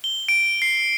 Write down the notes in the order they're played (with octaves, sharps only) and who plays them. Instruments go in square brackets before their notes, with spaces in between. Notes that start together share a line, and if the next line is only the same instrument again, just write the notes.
[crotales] G7
D7
C7